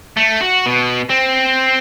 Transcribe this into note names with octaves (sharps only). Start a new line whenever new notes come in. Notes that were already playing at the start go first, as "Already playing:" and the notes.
A3
F#4
B2
C4